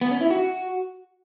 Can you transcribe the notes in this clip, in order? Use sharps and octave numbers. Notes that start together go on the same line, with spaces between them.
B3
C#4
E4
F#4